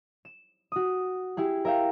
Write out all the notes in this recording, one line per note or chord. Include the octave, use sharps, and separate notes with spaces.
E7
F#4 D#6
E4 G4 G#4
A#4 E5 F5 G5